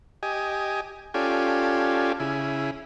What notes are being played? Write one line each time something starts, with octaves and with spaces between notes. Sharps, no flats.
G4 D#5 G#5
C#4 F4 G4 A4 D5 G#5
C#3 E4 G#4